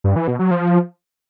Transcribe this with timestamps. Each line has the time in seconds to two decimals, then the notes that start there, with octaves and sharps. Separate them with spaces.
0.04 G2
0.16 E3
0.28 B2
0.39 F#3
0.51 F3